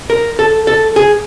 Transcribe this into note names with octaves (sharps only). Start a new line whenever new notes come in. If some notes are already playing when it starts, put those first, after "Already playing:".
A#4
A4
A4
G#4